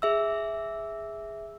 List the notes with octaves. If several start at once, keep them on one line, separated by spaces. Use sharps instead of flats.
G#4 E5 E6